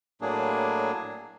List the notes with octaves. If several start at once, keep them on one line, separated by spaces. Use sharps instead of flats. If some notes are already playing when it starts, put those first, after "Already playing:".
A2 F#3 A#3 D4 G#4